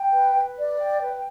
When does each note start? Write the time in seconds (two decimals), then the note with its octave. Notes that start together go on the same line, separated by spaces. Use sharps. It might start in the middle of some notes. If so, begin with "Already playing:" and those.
Already playing: G5
0.12 B4
0.35 B4
0.58 D5
0.79 G5
1.01 B4